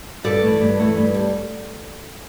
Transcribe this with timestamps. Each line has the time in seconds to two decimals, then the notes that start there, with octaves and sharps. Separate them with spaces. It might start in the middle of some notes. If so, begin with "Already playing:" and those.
0.24 G2 A4 D5
0.42 E3 A3
0.60 G2
0.79 E3 A3
0.97 G2
1.14 G3